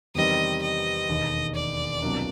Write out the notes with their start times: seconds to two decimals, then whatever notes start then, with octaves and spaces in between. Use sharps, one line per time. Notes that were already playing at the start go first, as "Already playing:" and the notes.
0.15 E2 C3 D#3 G3 C4 D#5
0.62 D#5
1.08 E1 D#2 D#3
1.55 D5
2.02 C2 B2 F#3 A#3 D4